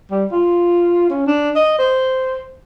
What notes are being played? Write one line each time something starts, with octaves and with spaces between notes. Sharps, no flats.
G3
F4
C#4
D4
D#5
C5